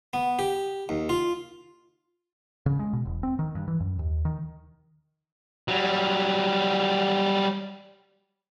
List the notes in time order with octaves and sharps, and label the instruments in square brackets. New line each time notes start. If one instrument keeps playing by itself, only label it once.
[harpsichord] B3
G4
D#2
F4
[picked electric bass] C#3
G#3
B2
E1
C4
D#3
G2
E3
F#2
D#2
D#3
[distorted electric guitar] F#3 G3